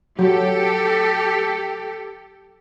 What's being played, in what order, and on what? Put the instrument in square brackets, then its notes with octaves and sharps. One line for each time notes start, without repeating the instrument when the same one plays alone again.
[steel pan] F#3 [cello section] G4 A4